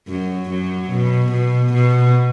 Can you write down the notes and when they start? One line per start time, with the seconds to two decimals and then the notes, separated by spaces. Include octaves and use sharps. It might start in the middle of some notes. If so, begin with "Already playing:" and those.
0.08 F#2 F#3
0.50 F#2 F#3
0.91 B2
1.32 B2
1.73 B2